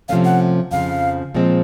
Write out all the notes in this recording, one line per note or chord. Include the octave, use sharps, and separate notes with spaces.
C3 F3 A3 C#4 F5
F#5
F2 C#3 F3 F5
A#2 F3 G#3 C4